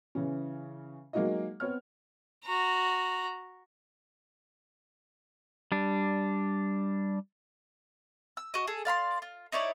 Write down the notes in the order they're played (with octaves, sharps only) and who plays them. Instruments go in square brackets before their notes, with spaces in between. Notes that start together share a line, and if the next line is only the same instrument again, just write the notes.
[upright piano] C#3 E3 C#4
F#3 G#3 A#3 D#4 F#4 D#5
B3 C4 C#5 F6
[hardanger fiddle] F#4 A#5
[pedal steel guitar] G3 D4
[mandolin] E6
F#4 D#5
G#4 A4
D5 F5 B5 C6
F4
D#4 E4 C#5 D5